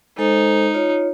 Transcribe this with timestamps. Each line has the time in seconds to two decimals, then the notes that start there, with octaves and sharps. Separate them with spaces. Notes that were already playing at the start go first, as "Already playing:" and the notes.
0.18 G#3 D#4 A4 C5
0.74 F4 C#5